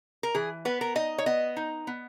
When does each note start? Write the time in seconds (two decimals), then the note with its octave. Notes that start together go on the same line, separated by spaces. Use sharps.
0.23 A#4
0.35 E3 G#4
0.65 B3 B4
0.81 A#4
0.95 D#4 D#5
1.18 C#5
1.26 B3 D#5
1.57 D#4
1.87 B3